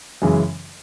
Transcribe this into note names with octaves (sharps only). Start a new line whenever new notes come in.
F#2 C#3 E3 G#3